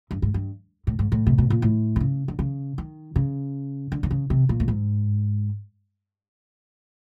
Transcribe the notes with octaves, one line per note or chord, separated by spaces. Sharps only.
G2
G#2
G2
A2
G#2
A2
C3
B2
A#2
A2
C3
C#3
D3
C#3
D#3
C#3
D3
D3
C#3
C3
A#2
A2
G#2